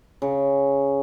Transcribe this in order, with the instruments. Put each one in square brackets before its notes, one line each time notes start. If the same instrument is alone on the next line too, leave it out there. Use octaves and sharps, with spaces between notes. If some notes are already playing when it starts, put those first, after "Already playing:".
[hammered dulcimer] C#3